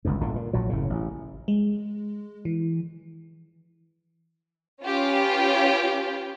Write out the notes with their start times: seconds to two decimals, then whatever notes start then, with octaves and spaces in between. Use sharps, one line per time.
0.05 G1 C#2 G2
0.20 G1 A#2 D3
0.36 A#2
0.53 A#1 A#2 F#3
0.69 F#1 A2 C#3
0.90 A1
1.48 G#3
2.45 E3
4.83 C#4 F4 G4 B4